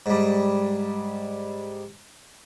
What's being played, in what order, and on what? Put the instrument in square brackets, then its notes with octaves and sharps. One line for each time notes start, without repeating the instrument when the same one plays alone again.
[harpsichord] G#2 G3